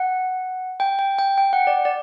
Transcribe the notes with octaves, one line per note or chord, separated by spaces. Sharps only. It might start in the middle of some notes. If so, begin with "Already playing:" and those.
Already playing: F#5
G5
G5
G5
G5
F#5
D5
D5